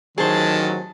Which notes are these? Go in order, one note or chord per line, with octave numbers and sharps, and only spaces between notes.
A1 D#3 F#3 G#4 C5 A5